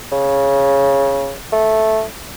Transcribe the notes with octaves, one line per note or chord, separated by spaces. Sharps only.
C#3
A3